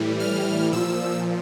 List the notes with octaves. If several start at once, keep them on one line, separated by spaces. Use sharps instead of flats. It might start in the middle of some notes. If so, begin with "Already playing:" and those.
Already playing: A2 E3 G3
F6
A#2 F3 E6